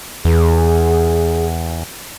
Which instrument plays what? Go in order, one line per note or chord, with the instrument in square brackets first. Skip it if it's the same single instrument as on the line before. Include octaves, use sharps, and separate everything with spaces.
[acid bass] E2 [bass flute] G#4